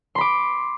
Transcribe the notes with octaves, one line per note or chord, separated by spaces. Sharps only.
B5 C6 D6